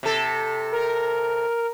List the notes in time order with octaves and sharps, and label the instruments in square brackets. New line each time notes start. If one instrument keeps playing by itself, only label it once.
[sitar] C3 A4
[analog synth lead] A#4